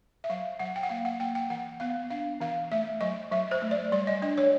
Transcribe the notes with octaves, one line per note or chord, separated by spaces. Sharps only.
E5
F#3 F5
F#3 F#5
G5
F#5
A#3 F5
F#5
A#3 G5
G5
E3 F#5
B3 F5
D4 F5
E3 F5
A3 E5
F#3 D#5
F#3 E5
C5
A3
D5
G3 D5
D#5
D4 D#5
C#5